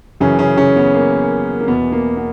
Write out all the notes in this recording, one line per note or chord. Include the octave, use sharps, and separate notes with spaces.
F#2 C#3 E3 C#4
C#3 C#4
C#3 C#4
B3
A#3
A#3
E2 B2 B3
A#3
B3